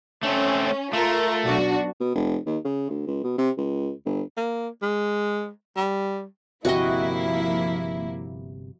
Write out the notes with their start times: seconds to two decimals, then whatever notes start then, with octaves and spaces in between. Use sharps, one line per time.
0.23 A3 C4 C#4
0.93 A3 F4 A#4
1.44 B1 D4 F#4
2.00 B2
2.15 F1
2.46 D#2
2.65 C#3
2.90 D2
3.07 C#2
3.24 B2
3.38 C3
3.58 C#2
4.06 G1
4.37 A#3
4.82 G#3
5.76 G3
6.65 G1 C3 F3 A#3 E4 F#4 D#5